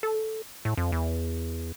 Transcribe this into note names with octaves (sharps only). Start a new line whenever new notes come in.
A4
A2
F2
E2